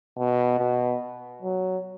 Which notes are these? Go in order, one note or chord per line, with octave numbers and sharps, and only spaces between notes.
B2
B2
F#3